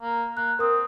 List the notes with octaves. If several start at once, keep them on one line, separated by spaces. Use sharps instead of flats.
A#3
A#3 F#6
C4 A#4 D#6